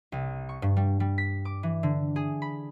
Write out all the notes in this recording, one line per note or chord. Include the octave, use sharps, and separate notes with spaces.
C2
C#6
G2
G3
G3
B6
D6
E3
D3
G#4
B5